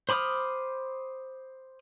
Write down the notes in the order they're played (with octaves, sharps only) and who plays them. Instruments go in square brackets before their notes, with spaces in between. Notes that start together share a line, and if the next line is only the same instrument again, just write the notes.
[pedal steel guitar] C5 B5 D6 D#6 F6